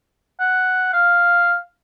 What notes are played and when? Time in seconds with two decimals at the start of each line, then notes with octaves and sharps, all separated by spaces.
0.40 F#5
0.93 F5